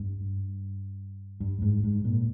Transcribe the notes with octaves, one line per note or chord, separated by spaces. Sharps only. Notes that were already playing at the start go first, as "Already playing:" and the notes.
Already playing: G2
G2
G#2
G#2
A#2